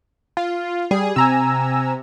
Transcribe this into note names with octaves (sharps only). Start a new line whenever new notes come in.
F4
G3 G#4
C3 G#5 A#5 E6